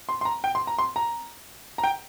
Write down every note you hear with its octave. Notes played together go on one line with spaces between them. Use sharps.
C6
C6
A#5
G5
C6
A#5
C6
A#5
A#5
G5